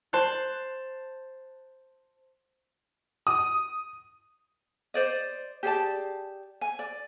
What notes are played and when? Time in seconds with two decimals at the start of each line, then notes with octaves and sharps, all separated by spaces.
0.13 C5 A5 C6 F#6
3.27 D#6
4.94 C5 D5 D#5
5.63 G4 G#4 D5 A5
6.61 G#5
6.79 D5